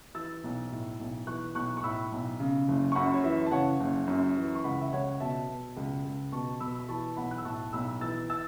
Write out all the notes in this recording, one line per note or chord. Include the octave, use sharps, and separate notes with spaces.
E3 E6 A6
B1
A2
B1
E3 C#6 F#6
B1 C#6 F#6
C#6
A2 B5 E6
B1
C#3
F#1
C#6
F#2 F#5 B5
C#5
E3 E5
A5
C#3 C#5 F#5
F#1
F#2
E3
C#6
C#2 F#5 B5
E5
C#2 C#5 F#5
B2 E5 A5
B2
C#2
C#2
B2 A5 C#6
B2 B5 E6
B5
E3 A5 C#6
B1 F#5 B5
F#6
E6
A2 A5 C#6
B1 B5 E6
E3 E6 A6
E6 A6